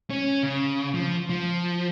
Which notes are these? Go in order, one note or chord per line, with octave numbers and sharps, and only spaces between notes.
C#4
C#3
F3
F3